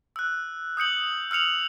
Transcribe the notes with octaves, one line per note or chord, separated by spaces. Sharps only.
E6 F#6
D#6 G6 C#7 F#7
E6 F6 C#7 F7 F#7